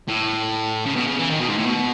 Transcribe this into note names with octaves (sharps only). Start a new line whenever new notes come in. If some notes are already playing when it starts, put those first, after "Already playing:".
A2
C#3
B2
C#3
E3
D#3
B2
G#2
A2
B2